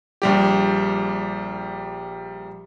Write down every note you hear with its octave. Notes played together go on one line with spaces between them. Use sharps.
A#1 G3 G4